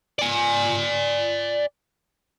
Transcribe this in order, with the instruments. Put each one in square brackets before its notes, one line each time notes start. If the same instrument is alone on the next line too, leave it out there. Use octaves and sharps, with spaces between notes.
[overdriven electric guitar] D5 G#5